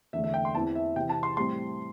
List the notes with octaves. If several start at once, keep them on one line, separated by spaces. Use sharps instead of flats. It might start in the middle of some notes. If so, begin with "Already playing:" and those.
E2 D3 A3 E5
E5
G5
C6
E2 E3 C4 A5
E5
C3 E3 C4 G5
A5
C6
A2 G3 C4 C6